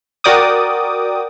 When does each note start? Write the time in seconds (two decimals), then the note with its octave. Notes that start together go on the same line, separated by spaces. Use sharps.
0.24 F#4 A#4 D5 G5 D6 D#6